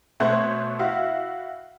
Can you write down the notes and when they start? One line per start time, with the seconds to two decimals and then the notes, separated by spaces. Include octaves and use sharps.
0.20 B2 A3 C5 C#5 F#6 G#6
0.79 E4 F#4 E5 F5